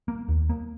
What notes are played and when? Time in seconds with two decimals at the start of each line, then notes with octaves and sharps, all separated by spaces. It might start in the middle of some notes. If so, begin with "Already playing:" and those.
0.08 A#3
0.28 D#2
0.49 A#3